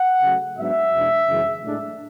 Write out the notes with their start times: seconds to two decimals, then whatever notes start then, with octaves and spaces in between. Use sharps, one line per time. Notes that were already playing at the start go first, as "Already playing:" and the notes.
Already playing: F#5
0.22 C#3 F#3 A3
0.58 G#2 F#3 B3 D4 E5
0.93 E2 B2 G#3 D4
1.29 F#2 C#3 E3 G#3 C#4
1.64 A2 G#3 D4